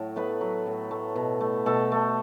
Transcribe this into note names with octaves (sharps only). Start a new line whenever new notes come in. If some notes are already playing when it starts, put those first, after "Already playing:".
Already playing: A2 F#3 A4
A3 B3 B4
F#3
A2
A3
B2
A3
B2 A3 A4
A3